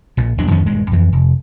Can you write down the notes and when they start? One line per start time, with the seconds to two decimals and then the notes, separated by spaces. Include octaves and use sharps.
0.17 A#1 A#2
0.38 D#1 E2 F#3 D4
0.51 F2 D#3 C#4
0.66 D#1 G2 G#3
0.92 F2 E3
1.13 F1